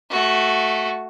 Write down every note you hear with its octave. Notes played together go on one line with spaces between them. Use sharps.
A3 F#4